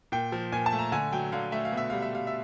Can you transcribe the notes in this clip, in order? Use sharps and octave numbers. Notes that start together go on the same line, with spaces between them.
A#2 G5
F3
A#2 G#5
A5
A3
A#5
D3 G#5
F#3 G5
D3 F5
A3 E5
F5
B2 E5
G3 F5
E5
G3 F5
E5